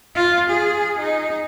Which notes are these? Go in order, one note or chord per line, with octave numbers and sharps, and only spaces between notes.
F4
G#4
D#4